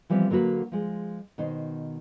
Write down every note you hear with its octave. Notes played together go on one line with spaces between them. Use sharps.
E3 F3 G3 B3 C4
D3 F#3 A#3 F#4 B4
F3 G#3
B2 D#3 D#4 C5